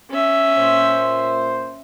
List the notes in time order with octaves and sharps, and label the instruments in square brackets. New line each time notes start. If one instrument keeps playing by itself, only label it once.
[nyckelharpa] C#4 E5
[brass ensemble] A#2 C5